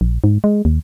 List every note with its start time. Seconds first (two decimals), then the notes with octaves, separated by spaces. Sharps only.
0.01 A#1
0.24 G#2
0.44 G#3
0.65 D#2